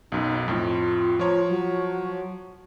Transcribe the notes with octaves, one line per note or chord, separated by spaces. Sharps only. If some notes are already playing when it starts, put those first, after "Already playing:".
B1 F#2 D#4
F2 A2 F4
F3 C#5 A#5
F#3